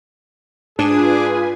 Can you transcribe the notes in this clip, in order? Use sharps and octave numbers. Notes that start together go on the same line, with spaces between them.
G#2 D4 F4 G#4 B4 G#5